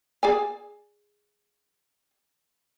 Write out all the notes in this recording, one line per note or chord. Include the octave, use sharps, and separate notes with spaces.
G#4 D5 G#5